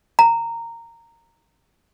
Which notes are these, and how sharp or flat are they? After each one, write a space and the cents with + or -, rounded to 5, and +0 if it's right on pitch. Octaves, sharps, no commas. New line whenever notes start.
A#5 -15